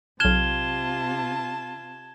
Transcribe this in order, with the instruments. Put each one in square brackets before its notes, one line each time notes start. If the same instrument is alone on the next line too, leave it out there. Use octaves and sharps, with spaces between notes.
[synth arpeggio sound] B1 F6 [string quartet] C3 F4 [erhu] A5 [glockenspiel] G#6 E7 G7